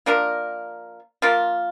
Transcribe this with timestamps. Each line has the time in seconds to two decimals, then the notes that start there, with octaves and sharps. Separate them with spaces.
0.06 F3 A#3 D4 A#4
1.22 F3 A#3 F4